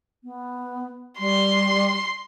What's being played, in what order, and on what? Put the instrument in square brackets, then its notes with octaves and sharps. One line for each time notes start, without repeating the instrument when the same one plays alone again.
[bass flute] B3
[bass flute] G3 [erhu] C6